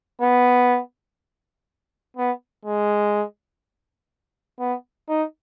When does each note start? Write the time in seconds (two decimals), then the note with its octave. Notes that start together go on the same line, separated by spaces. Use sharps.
0.21 B3
2.17 B3
2.65 G#3
4.60 B3
5.09 D#4